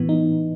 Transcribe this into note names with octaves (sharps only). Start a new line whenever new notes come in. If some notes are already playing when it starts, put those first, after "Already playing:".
Already playing: A2 E3 B3
D#4